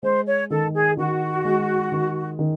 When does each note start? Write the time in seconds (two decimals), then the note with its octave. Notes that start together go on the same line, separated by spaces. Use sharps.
0.03 G#3 C5
0.27 C#5
0.50 D#3 A4
0.74 G#4
0.97 D#3 F#4
1.45 G#3
1.92 D#3
2.39 D#3